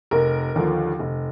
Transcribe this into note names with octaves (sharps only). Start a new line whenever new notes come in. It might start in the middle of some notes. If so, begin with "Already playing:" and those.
F1 A#4
D#2 D3 F3
F1